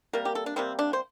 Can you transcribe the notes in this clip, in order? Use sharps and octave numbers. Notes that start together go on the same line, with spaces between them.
C3 G3 A#3 A#4
G4
A4
D4
C3 G3 A#3 C4
D4
C5